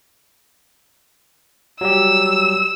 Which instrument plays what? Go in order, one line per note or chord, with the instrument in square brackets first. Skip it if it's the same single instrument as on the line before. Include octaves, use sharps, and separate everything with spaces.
[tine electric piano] F#3 G3 G4 [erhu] E6